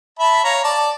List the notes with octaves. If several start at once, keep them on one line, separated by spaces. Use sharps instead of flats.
E5 A5 B5
C#5 F5 A#5
D5 A5